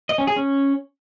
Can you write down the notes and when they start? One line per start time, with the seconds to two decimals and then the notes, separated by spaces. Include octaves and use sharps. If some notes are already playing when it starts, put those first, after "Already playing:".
0.09 D#5
0.18 C#4
0.27 G#4
0.36 C#4